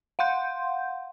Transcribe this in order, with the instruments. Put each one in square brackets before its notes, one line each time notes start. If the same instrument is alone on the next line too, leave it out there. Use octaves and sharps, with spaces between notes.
[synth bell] F5 F#5 C6 G6